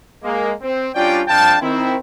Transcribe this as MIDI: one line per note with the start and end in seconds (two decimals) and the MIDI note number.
0.24 0.51 56
0.24 0.51 58
0.62 0.88 60
0.95 1.22 55
0.95 1.22 61
0.95 1.22 62
0.95 1.22 65
0.95 1.22 74
0.95 1.22 79
1.28 1.56 41
1.28 1.56 53
1.28 1.56 62
1.28 1.56 77
1.28 1.56 79
1.28 1.56 81
1.61 1.96 51
1.61 1.96 60
1.61 1.96 64